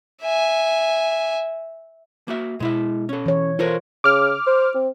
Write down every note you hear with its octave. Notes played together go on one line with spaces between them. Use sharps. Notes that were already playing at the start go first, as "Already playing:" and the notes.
E5 G#5
A#3 F#4 E5
B2 G#3 E4 E5
C#4 A4
E3 C#5
F4 A4 A#4 C5 C#5
C#3 D6 F6
C5
C4